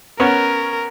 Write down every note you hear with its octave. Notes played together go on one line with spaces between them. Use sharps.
B3 C#4 A#4 C#5